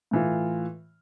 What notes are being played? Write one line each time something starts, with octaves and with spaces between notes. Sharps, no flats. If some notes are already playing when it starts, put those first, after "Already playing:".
A2 E3 F4